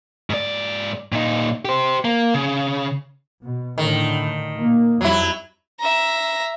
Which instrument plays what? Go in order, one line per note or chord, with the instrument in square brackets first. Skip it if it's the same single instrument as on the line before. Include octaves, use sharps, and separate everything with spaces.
[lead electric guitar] G#2 D5
A#2 D#4
G4 C5
A#3
C#3
[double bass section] B2
[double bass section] A2 D3 [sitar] D#3
[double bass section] A#2 A#3
[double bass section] F2 G3 [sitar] F#3 E4
[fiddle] E5 A#5